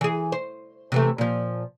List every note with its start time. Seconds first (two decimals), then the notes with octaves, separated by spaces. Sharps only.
0.01 E3 G#4
0.32 C5
0.92 C3 E3 A3
1.18 A#2 F3